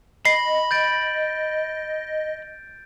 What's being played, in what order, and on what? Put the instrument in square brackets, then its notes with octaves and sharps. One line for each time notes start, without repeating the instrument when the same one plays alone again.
[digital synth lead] D#5 [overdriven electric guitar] B5 [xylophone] C7
[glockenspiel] G6 A6 D7